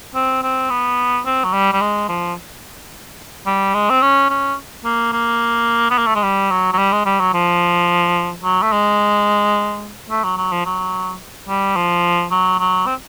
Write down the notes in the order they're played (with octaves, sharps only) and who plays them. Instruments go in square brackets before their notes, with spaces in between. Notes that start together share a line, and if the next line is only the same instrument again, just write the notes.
[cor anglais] C4
C4
B3
C4
F#3
G3
G3
G#3
F3
G3
G#3
C4
C#4
C#4
A#3
A#3
B3
A#3
A3
G#3
G3
F#3
F#3
G3
G#3
G3
F#3
F3
F#3
A3
G#3
A3
F#3
F#3
F3
F#3
G3
F3
F#3
F#3
C4